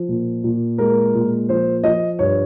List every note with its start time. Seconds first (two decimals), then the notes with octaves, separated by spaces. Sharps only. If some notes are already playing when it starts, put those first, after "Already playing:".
Already playing: F3
0.09 A#2
0.44 A#2
0.78 G#3 A#4
1.15 A#2
1.49 F3 C5
1.84 F3 D#5
2.19 G2 C#5